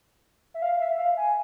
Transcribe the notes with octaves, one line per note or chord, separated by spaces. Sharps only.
E5
F5
E5
F5
G#5